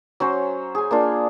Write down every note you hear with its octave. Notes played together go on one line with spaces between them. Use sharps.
F#3 C#4 C5
G#4 G#5
A#3 D4 F4